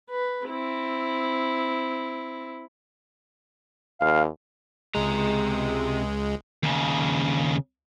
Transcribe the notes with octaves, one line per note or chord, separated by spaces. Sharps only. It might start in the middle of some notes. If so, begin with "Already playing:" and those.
B4
C4 E4
D#2 F5
C#2 C3 G#3 A#5
D#2 C#3